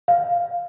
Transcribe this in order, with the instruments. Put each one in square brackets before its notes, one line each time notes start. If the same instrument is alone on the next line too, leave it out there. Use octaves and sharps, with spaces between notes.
[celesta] F5